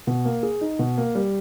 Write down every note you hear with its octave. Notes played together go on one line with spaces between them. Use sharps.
B2
A#3
G#4
D#4
B2
A#3
G3